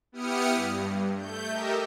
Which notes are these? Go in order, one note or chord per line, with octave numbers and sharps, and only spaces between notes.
B3 E4 G4 D#6 F6 C#7
G2
A3 G6
G4 A4 A#4 D#5 E5